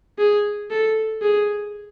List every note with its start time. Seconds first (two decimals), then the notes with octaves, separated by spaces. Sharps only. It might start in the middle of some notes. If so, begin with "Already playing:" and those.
0.18 G#4
0.71 A4
1.22 G#4